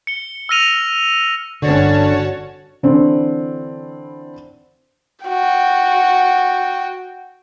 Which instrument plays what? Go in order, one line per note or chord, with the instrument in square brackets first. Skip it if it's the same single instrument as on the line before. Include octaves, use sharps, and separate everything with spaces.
[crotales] C#7 G7
E6 F6 A#6 D#7 F7
[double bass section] G1 C#4 [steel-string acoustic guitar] D3 [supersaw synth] F#4 C#5 A5 [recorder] D5
[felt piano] D3 E3 C4 D4 E4
[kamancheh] F#4 G5